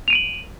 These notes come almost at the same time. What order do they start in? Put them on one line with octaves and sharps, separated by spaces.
F7 D#7 D7 F#7